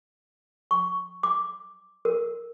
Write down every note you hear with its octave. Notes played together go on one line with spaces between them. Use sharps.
C#6
D6
A#4